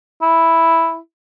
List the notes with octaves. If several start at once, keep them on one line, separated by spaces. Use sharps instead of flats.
E4